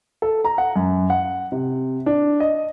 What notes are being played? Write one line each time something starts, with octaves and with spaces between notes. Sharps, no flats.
A4
A#5
F#5
F#2
F#5
C3
D4
D#5